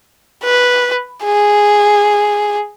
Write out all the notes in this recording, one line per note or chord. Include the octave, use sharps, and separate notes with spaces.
B4
G#4